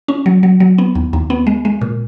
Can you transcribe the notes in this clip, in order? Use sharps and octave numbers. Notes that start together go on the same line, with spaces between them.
C#4
F#3
F#3
F#3
B3
D#2
D#2
B3
G#3
G#3
A#2